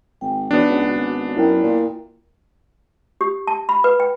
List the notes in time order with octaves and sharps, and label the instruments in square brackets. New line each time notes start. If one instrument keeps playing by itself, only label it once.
[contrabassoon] G#1 [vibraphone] G5
[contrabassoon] E2 [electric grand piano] B3 D4 [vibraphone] D#4 F#4 C#5
[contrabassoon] C#2
G#1
[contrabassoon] F#2 [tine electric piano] E4 A#4 G5
[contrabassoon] A#2
[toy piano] G4
A5
B5
B4
G5